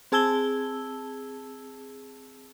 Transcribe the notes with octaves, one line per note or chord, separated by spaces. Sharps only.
C4 G#4 A5 E6 G#6 G7